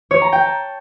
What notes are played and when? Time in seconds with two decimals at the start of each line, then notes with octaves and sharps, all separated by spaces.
0.11 C#5
0.22 A#5
0.32 G5
0.43 A5